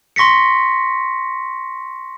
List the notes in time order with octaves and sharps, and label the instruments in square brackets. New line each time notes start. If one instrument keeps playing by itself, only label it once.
[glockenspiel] C6 C#6 A#6 B6 C#7